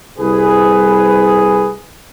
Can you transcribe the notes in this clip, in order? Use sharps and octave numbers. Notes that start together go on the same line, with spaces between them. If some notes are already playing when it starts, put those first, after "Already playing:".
C2 G#4 B4